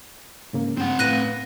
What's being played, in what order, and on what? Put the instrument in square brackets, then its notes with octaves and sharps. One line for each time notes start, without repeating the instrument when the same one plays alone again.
[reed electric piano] G#2 C#3 A#3
[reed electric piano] G2 [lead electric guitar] C4 F#5
[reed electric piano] A2 B4 F5 [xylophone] F#6 A#6 D#7